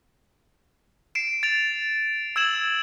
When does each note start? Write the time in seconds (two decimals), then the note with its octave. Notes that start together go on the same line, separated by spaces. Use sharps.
1.15 C7 D7 E7
1.43 A6 D7 F7
2.36 E6 G#6 E7 F#7